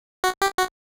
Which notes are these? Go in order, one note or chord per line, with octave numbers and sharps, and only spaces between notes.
F#4
G4
F#4